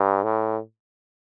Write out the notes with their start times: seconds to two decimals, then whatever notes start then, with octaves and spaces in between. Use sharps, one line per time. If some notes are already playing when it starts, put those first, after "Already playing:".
Already playing: G2
0.24 A2